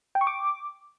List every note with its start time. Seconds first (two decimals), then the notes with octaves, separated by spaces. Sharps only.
0.15 G5
0.21 C#6
0.27 D6